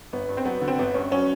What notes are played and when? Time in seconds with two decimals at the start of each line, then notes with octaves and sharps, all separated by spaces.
0.13 G1 B3
0.29 G2
0.37 C4
0.45 F#3 B3
0.61 D3
0.68 C4
0.79 G1 B3
0.94 G2 C#4
1.11 F#3 C#4